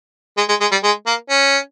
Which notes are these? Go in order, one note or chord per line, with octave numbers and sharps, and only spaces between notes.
G#3
G#3
G#3
G3
G#3
A#3
C#4